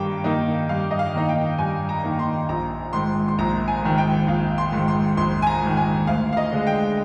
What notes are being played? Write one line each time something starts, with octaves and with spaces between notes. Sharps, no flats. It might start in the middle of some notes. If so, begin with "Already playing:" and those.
Already playing: G2 D#3 A#3 G5 A#5
D#3 A#3 D#4
G2 F5
D#5
F5
D#3 A#3 D#4
G5
G2 G#5
A#5
D#3 A#3 D#4
C6
A#1 A#5
G#2 D#3 C6
C6
A#1 A#5
G#5
G#2 D#3
G5
A#1 F5
C6
G#2 D#3
C6
A#1 C6
G#5
A#5
G#2 D#3
G#5
D2 F5
F5
D#5
D3 G#3
G5